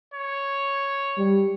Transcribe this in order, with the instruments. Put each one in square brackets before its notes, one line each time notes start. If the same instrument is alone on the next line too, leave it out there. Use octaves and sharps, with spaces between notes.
[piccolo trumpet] C#5
[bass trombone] G3